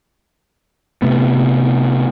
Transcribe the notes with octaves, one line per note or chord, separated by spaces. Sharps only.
C3 A3 B3